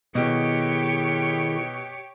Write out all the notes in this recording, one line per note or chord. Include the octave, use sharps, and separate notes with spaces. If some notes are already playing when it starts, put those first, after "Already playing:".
B2 D#3 E4 G4 G#4 C#5